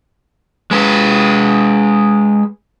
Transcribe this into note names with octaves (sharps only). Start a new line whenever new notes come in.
G#3 B4